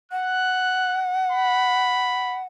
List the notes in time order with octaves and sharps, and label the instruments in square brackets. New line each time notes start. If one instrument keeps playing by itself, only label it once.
[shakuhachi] F#5 [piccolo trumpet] F#6
[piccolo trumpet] B5